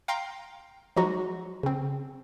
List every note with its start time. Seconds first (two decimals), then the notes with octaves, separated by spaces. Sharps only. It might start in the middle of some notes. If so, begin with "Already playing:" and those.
0.08 F5 G5 A#5 C6
0.96 F3 F#3 G#3 D#4 F#4
1.63 C#3 C4